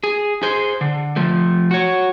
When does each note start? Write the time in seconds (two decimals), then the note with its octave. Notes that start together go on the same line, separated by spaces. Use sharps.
0.04 G#4
0.43 G#4 C5
0.81 D3
1.16 F3 A3
1.71 F#4 C#5